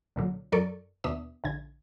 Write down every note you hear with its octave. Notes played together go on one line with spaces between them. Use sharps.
C2 A#2 D3 F#3
F#2 F#3 A4 A#4 D5 C#6
D#2 B2 B3 D4 E5 D#6
A#1 D3 G#6